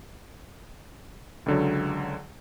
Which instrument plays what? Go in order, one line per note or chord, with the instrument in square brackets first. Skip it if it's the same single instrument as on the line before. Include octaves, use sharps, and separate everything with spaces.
[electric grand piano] C#2 D3 F#3